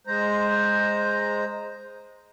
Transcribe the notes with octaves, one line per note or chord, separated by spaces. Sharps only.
G#3 C5 A#5